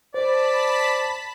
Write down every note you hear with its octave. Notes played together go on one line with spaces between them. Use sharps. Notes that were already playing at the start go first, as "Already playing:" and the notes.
C5 D5 A5 B5 B6